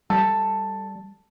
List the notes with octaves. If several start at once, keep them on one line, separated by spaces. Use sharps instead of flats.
G3 A4